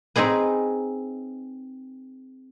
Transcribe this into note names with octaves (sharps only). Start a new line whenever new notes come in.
C4 D#4 G#4 B4